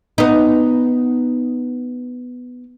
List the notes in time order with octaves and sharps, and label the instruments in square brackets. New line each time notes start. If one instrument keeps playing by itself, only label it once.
[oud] B3 D#4